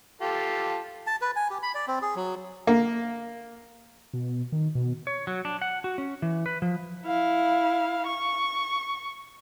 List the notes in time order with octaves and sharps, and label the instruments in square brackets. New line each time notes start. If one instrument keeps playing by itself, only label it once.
[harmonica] F4 G4 A4
[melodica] A5
B4
G#5
G4
B5
D5
C4
G#4
F#3
[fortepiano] A#3
[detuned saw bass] B2
D#3
B2
[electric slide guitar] C#5
F#3
D4
F#5
F#4
C#4
E3
B4
F3
[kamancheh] E4 F5
C#6